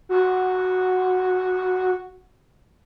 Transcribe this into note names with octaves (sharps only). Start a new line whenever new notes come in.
F#4